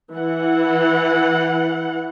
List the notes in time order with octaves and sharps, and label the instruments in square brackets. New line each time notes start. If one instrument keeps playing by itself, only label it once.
[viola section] E3 F#5